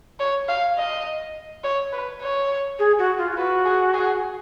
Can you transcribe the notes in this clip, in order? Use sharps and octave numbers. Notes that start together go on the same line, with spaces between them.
C#5
F5
D#5
C#5
B4
C#5
G#4
F#4
F4
F4
F#4 B4
G#4
G#4